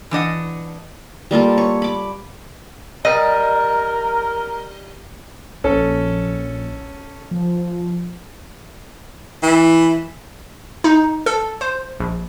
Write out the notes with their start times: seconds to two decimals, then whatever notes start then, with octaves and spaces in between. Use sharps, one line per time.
0.11 E3 D4 D#5 F#5
1.31 G3 A#3 F4 A4
1.58 C#5
1.82 B5 D6
3.05 G3 A#4 D#5
5.64 A#1 C#4 A4
7.31 F3
9.42 E3
10.84 D#4
11.26 A4
11.61 C5
12.00 A#1